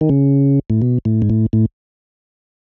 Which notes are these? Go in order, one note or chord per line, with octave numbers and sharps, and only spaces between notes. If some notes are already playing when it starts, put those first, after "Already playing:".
D#3
C#3
A2
B2
A2
G#2
A2
A2